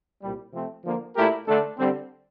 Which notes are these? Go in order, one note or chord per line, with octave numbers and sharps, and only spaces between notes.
C2 A#2 G3
C3 F3 A3 C4
D3 F3 A#3
A#2 A3 E4 G4 A#4
D3 A3 D4 A4
D3 G3 C4